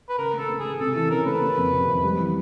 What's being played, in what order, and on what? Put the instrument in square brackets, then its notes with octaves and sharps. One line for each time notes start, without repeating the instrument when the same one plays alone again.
[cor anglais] B4
[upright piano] C#3 [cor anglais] A#4
[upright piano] A3
[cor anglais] A4
[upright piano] A3
[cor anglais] G#4
[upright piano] A3
[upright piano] C3 [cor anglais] A4
[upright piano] E3 [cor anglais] A4
[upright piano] C#4 [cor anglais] A#4
[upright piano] A3 [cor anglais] B4
[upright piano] A#3
F2
C3
F2
G3
E3